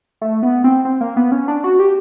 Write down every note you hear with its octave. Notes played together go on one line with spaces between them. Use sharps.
A3
B3
C4
C4
A#3
B3
C#4
D4
F#4
G4